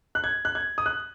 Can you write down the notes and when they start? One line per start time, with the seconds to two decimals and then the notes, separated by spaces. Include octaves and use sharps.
0.15 F#6
0.24 G#6
0.45 F#6
0.55 G#6
0.78 D#6
0.86 F#6